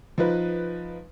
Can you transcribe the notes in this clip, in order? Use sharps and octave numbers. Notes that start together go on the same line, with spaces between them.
F3 D#4 B4